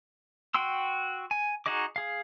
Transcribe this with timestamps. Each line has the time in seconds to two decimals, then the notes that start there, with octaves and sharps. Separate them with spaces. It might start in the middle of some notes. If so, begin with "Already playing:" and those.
0.54 F#4 G5 C6 E6
1.31 G#5
1.66 D#4 F#4 G#4 D#5 D6
1.96 G#4 F5